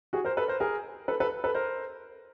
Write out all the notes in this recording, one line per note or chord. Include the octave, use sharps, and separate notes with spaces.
F#4 G#4
A#4 C5
A4 B4
A#4 C5
G#4 A#4
A4 B4
A4 B4
A4 B4
A#4 C5